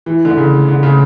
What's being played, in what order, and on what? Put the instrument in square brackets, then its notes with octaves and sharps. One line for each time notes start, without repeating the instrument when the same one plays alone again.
[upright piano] E3
D3
C#3
D3
C#3